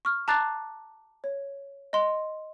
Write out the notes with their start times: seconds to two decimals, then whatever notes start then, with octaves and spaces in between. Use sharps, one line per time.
0.05 C#6 F6
0.28 A5 A#5 D6 F#6 A6 C7
1.24 C#5
1.93 D#5 C6